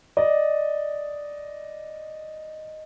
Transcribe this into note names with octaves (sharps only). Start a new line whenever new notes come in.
D5 D#5